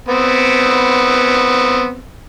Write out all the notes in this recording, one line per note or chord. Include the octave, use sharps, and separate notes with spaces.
B3 C4